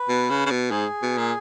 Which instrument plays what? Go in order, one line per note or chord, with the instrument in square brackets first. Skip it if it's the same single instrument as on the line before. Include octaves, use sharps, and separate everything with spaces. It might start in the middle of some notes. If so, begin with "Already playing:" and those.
Already playing: [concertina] B4
[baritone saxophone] B2
C#3
C#3
B2
[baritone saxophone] G#2 [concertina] G#4
[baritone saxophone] B2
A#2